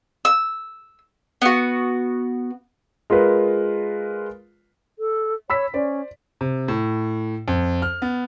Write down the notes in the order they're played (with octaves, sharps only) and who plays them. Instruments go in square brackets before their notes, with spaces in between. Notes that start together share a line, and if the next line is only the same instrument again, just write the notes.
[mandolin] E6
B3 F#4
[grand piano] G#3 F4 A#4 B4
[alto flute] A4
[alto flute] C#5 [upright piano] B5 E6 B6
[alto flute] C#4 [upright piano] C5 D5
[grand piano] C3
A2
F2
F6
B3